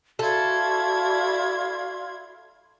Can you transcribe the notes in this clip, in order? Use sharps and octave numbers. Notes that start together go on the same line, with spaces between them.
E4 F#4 A4 D5 F5 C6 G#6